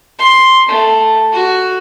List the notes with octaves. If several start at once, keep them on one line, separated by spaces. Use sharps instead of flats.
C6
A3
F#4